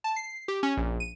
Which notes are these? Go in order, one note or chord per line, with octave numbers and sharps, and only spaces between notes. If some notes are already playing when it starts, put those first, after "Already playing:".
A5
C7
G4
C#4
A#1
D#7